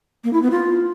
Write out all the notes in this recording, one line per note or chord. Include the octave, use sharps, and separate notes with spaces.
A#3
E4
B3
F4